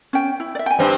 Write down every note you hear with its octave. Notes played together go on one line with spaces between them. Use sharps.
C#4 G5
E4
D5 E5
G5 G#5
G2 C4